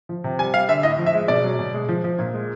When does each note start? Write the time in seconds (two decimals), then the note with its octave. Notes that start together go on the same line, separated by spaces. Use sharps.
0.09 F3
0.24 C3
0.39 G3 G#5
0.54 G3 F5
0.68 D3 E5
0.83 A2 D#5
0.99 F3
1.06 E5
1.14 G#3
1.28 B2 D5
1.44 F#3
1.59 B2
1.74 G#3
1.89 F3
2.04 F3
2.19 A#2
2.34 G#3